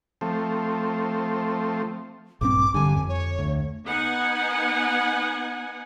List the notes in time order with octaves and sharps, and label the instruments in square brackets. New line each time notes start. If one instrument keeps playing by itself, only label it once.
[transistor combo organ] F3 A3 C4
[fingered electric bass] A#1 G2 C4 [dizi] D6
[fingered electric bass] G2 D3 [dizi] G#5
[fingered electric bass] F2
[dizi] C#5
[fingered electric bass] D2
[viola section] B3 D#4 F#5 G#5